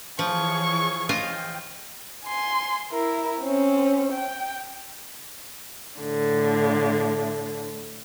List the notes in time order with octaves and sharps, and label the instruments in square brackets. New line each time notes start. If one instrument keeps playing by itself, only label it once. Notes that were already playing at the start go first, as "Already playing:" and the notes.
[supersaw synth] E3 G#4 C#5 [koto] F3 [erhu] C#6
[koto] F4 D#5 F5 [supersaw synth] G5
[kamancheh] G#5 C6
E4 A#4
C4 C#4
G5
[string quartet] A2 D3